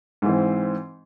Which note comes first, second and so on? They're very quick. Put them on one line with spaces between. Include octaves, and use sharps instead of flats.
G#2 E3 C4